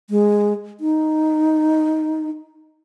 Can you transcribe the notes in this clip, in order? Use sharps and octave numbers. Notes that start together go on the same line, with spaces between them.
G#3
D#4